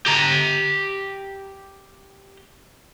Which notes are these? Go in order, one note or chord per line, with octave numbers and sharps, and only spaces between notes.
G4 A#5